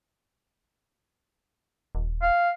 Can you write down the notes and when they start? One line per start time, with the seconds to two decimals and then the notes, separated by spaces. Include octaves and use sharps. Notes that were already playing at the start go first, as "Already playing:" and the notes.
1.95 D#1
2.23 F5